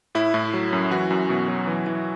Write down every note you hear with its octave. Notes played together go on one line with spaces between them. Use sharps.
A2 E4
A2
F#3
F#2
E3 F#4
F#2
B2
F#3
E3
E3